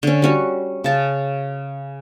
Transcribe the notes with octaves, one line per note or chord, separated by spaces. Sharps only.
D3 C#4
G3 C#4 F#4
C#3 A5